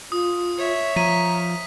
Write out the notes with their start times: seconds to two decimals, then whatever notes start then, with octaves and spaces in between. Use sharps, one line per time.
0.12 F4 D#6
0.57 C#5 E5
0.96 F3 A#5 B6 D#7